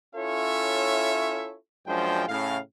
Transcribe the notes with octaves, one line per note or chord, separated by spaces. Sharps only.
C#4 E4 F4 A4 C#5 E5
F#2 F3 G#3 D4 C5 G5
A2 C#3 F5